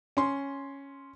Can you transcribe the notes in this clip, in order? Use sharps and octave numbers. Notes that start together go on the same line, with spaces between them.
C#4 C6